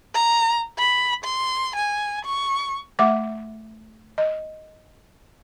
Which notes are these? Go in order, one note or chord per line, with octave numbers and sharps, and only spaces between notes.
A#5
B5
C6
G#5
C#6
A3 E5 F#5 D6
D#5